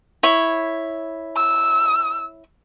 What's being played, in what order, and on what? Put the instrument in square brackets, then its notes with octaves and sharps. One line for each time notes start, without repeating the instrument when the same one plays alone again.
[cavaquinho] E4 C#5
[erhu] E6